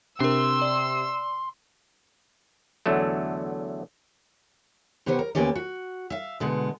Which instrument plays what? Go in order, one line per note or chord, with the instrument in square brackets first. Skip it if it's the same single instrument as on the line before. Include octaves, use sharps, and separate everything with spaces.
[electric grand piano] C3 [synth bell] D4 A#4 [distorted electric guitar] C6 [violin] E6
[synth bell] D5
[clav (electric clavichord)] E2 D3 F#3 A3
[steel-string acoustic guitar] C3 B3 G4 C5 C#5
A#4
D2 A#3 B3 C#4 G4 D5
F#4
E5 F5
B2 D3 G#3 B3